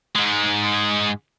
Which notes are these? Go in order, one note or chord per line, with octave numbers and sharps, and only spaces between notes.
G#2 G#3